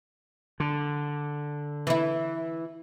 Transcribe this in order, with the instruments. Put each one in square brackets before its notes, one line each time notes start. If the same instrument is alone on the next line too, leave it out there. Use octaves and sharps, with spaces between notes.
[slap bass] D3
[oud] E3 E4